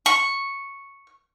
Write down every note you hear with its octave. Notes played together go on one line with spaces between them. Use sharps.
C#6